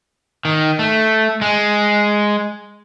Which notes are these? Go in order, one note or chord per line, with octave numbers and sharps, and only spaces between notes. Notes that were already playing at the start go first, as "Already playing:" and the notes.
D#3
A3
G#3